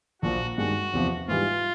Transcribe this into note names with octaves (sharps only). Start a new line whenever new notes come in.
A#1 A#2 F3 F#4
G2 D#3 G#3 F#4
E2 C3 F3
G#2 E3 G3 F4